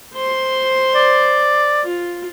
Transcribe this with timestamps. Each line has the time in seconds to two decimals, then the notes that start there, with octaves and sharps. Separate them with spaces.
0.14 C5 C6
0.95 D5
1.84 F4